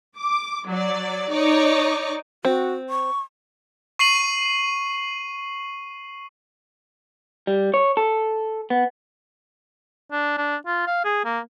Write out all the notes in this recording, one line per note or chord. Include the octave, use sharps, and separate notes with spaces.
D6
F#3 D5
D#4 C#5 D5 C#6 D6
C4 F#4
C#6
C#6 C7 D#7 F#7
G3
C#5
A4
B3
D4
D4
F4
F5
G#4
A#3